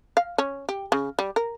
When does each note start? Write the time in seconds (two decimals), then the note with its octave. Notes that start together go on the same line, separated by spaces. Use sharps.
0.17 F5
0.38 C#4
0.69 G4
0.92 C#3
1.19 G3
1.36 A#4